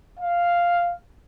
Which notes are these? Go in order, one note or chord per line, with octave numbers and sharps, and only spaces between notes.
F5